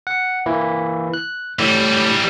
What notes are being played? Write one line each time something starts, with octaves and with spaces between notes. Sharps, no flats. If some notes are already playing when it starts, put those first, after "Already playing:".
F#5
E3 A#3 E4
F#6
A2 E3 G3